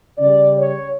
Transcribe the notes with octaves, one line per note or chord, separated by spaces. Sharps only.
C#3 G3 D5
C#5